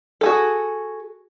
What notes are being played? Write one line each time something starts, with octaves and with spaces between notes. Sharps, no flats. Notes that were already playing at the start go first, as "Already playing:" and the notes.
F#4 G#4 A4